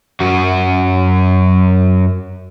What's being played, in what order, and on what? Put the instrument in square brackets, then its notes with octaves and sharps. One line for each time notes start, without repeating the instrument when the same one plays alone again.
[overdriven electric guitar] F#2 F#4